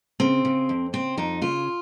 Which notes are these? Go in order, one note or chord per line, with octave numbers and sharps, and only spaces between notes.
C#3 C4
C#3
F2
C#3 C4
F2 D#4
C#3 F4